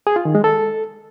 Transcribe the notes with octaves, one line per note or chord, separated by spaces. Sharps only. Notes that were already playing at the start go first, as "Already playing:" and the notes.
G#4
F4
D#3
G#3
A4